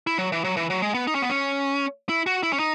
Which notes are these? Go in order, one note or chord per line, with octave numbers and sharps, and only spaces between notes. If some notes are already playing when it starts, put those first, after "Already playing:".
E4
F#3
E3
F#3
E3
F#3
G#3
B3
D#4
C#4
B3
C#4
E4
F#4
E4
C#4
D#4